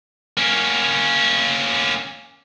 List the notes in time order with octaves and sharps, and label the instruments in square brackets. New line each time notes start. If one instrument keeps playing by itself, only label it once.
[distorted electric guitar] A#3 C#4